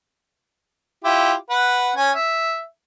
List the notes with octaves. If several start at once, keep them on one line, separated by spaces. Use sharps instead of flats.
E4 F4 G4
B4 F#5
C#4 G#5
E5